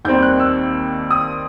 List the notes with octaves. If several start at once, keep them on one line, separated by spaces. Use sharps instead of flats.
D#2 D#3 G3 C4 G6
F#6
E6
D#6